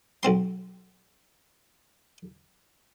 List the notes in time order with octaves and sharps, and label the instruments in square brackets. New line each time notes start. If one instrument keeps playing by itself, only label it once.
[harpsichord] B1 C4 C6